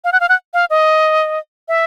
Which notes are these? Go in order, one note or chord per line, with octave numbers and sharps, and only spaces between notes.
F5
F#5
F5
F#5
F5
D#5
E5